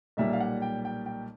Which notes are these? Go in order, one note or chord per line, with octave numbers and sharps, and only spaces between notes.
B1 A#2 G3 E5
F5
F#5
G5
G5
G5